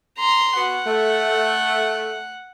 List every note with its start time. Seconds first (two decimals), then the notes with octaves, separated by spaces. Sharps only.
0.18 A#5 C6
0.57 B3 F#4 F#5
0.86 A3